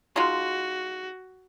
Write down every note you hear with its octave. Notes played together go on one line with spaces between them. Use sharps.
G#3 D#4 F4 F#4